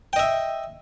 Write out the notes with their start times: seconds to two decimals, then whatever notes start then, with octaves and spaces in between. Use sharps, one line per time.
0.13 G5
0.16 D#5
0.19 E5